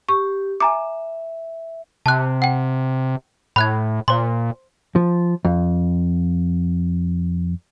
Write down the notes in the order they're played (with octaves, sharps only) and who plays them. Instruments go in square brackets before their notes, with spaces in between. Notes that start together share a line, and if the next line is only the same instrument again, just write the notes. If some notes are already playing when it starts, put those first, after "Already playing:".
[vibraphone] G4 [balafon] C#6
[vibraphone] E5 [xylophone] G#5 A#5 D6
[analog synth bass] C3 [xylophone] A5 F#6
[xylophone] F#5 G5
[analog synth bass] A2 [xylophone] B5 F#6 G#6
[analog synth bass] A#2 [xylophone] C5 C6
[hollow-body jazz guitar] F3
F2